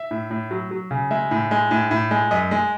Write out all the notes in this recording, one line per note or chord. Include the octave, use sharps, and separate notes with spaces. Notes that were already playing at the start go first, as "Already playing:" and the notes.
Already playing: E5
A2
A2
F#3
F#3
C#3
G#3 E5
A2
G#3
A2
A2
G#3
F#2 D#5
G#3